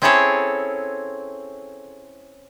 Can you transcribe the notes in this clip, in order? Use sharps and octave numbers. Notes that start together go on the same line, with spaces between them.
C4 C#4 E4 G#4 A4 C#5